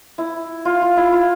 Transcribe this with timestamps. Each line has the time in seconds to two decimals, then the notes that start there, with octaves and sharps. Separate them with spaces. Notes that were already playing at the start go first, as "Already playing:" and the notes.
0.18 E4
0.65 F4
0.82 F4
0.97 E4
1.12 F4